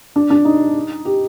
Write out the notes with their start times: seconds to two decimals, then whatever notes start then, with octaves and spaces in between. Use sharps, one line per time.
0.16 D4
0.30 D4
0.45 D#4
1.05 G4